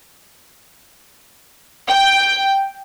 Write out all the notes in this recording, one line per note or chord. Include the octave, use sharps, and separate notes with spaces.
G5